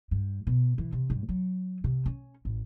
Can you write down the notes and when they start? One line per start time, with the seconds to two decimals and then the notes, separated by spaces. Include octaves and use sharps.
0.11 G2
0.47 B2
0.78 E3
0.92 C3
1.10 G2
1.29 F#3
1.84 C3
2.06 C#4
2.45 A1